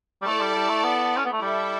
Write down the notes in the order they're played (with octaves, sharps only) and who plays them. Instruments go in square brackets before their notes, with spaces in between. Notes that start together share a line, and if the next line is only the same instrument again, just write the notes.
[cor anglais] G3
[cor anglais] A3 [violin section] E4 A4 D5 A5
[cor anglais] G3
G3
A3
B3
C#4
B3
A3
[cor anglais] G3 [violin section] E4 A4 E5